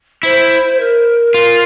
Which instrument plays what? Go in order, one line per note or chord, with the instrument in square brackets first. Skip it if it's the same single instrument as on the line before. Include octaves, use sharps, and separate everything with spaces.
[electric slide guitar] E4 [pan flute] C5
[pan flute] A#4
[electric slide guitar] F4